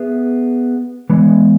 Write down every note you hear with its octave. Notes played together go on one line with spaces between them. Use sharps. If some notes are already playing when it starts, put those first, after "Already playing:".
Already playing: B3 G#4 E5
E3 G#3 B3